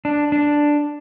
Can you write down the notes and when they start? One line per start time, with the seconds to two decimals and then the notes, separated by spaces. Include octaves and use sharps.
0.05 D4
0.32 D4